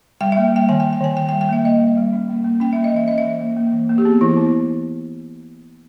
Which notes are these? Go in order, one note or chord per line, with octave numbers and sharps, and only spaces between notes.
G3 G5
A#3 E5
G3 G5
D#3 G#5
G5
D#3
G5
D#3 G#5
D#3 G5
G5
G3
G5
A#3 E5
A#3 D#5
G3
G3
C#4
A#3
A#3
C#4 G5
A#3 E5
D#5
E3 E5
C#4 D#5
E5
E3
A#3
A#3
E3
A#3
G4
B3 G#4
E3 E4
B3